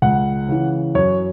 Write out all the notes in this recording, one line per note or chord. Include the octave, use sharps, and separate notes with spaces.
C#2 F#5
C#3 E3
F#2 C#5